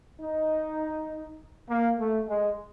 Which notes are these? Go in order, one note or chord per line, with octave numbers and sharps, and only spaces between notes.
D#4
A#3
A3
G#3